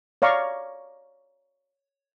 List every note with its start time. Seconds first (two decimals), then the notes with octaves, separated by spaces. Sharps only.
0.22 C#5 D5 F5 A#5 C#6